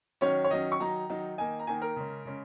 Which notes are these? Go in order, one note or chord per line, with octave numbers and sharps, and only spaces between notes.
D#3 F#3 C#4 C#5
C#5
D#3 F#3 C#4 D#5
C#6
D#3 F#3 D#4 A#5
D#3 F#3 D#4
D#3 A#3 D#4 G#5
A#5
D#3 A#3 D#4 G#5
A#4
C#3 G#3 C#4
C#3 G#3 C#4